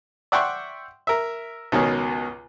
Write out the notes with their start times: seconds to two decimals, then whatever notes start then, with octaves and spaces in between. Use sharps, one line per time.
0.32 D5 E5 F#5 G5 C6 C#6
1.07 A#4 E5
1.72 C#2 B2 D#3 C#4